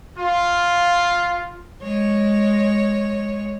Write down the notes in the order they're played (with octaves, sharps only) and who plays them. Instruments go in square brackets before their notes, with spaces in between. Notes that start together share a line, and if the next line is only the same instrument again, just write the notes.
[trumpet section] F4
[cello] G#3 C#5